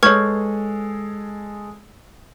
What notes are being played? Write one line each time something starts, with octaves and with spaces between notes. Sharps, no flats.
G#3 G#4 A4 B4 C#5 C#6 G#6